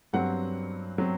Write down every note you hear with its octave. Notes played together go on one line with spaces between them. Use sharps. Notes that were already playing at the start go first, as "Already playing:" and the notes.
G2 F#3 C4 F#5
F#3 C4